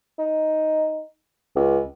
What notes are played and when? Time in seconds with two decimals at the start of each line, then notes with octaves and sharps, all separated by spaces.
0.19 D#4
1.56 C#2